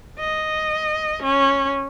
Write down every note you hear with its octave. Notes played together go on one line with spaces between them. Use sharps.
D#5
C#4